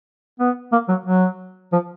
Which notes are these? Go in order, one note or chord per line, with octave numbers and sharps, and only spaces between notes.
B3
A#3
F#3
F#3
F3